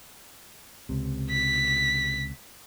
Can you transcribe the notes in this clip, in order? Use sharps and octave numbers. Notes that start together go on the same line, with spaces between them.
C#2 C3
B6